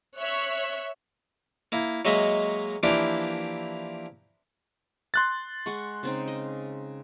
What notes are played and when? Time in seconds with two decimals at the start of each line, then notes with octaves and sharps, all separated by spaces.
0.18 C#5 E5 F#6
1.72 A#3 E4
2.05 F#3 G#3 A#3 D#5 E5
2.83 E3 F3 A#3 D4 E4 G4
5.14 C6 F#6 A6
5.66 G#3 F#5 C#6
6.03 C#3 C4 D#4
6.28 D#5